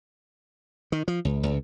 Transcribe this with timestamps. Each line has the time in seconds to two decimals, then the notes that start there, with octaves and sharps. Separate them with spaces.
0.92 D#3
1.08 F3
1.25 C#2
1.43 C#2